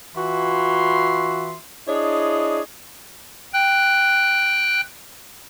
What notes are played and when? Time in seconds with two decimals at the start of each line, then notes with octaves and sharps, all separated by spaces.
0.15 E3 F4 F#4 E5 C6
1.88 D4 E4 G#4 C#5 D#5
3.54 G5 F#6